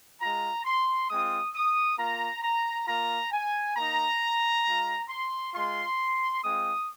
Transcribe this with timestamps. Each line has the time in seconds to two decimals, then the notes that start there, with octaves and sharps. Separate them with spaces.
0.20 G#3 F4 A#5
0.65 C6
1.09 G#3 C4 F4 D#6
1.54 D#6
1.98 A#3 F4 A#5
2.43 A#5
2.87 A#3 F4 A#5
3.32 G#5
3.76 A#3 D#4 A#5
4.65 G#3 F4
5.09 C6
5.53 G#3 F4 C6
6.42 G#3 C4 F4 D#6